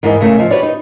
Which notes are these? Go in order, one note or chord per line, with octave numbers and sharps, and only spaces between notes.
E2 G#2 A#3 E4 A#4 D#5
C#3 A3 A#4
F3 D#5 E5
F#4 G4 B4 C#5 D5
D#4